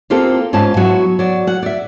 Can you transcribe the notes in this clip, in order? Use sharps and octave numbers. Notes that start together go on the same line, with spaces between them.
A#3 C4 F4 G4 A4
G#2 C#4 F4 A5
F#3 B3 E4 F#4
F#3 D5
F#4 F#5
D5 E5